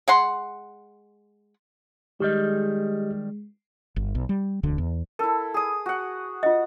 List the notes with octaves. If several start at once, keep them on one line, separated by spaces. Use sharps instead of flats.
G#3 F#5 C6
D#3 G3 G#3 G4 D#5
G1
B1
G3
E1 D2 D3
E2
E4 A4 A#4
G#4 D#6
F#4 F#5
F4 D#5 F#5